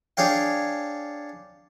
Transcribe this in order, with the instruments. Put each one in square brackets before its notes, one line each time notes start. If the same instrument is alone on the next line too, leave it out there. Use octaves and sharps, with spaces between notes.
[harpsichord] D4 G#4 C#5 F5 G5